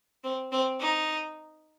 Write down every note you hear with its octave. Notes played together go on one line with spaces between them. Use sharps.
C4
C4
D#4